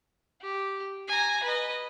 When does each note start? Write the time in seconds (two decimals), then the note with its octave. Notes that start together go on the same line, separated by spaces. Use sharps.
0.42 G4
1.08 G#5 A#5
1.43 B4 D#5